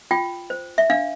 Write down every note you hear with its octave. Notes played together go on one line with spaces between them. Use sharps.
F4 G5
C5
E5
D4 F5